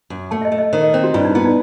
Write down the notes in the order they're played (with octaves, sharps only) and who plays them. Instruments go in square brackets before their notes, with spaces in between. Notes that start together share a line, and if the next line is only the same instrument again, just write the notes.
[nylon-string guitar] F#2
[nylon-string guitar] A3 [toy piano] A5
[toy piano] E5
D#5
[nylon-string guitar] A3
[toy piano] D#5
[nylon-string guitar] D#3 [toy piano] C5
[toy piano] D#5
[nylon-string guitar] C4 [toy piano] C5
[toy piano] F#4
[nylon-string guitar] G2 [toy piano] E4
[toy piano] D#4
[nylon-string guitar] B3 [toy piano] E4
[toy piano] D#4